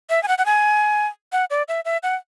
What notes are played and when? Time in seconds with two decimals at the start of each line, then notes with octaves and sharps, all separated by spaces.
0.10 E5
0.23 G#5
0.28 F#5
0.38 F#5
0.46 G#5
1.33 F#5
1.50 D5
1.68 E5
1.85 E5
2.03 F#5